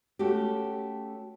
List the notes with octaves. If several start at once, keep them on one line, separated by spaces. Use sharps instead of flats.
A3 C#4 F#4 G4